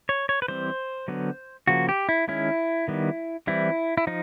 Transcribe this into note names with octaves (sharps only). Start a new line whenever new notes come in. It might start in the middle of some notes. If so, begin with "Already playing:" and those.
C#5
C#5
B4
E3 G3 C4 C5
D3 F#3 B3
C#3 F3 A#3 F#4
G4
E4
D#3 G#3 C#4 E4
D#3 G3 B3
E3 G3 C4 E4
E4
F3 D#4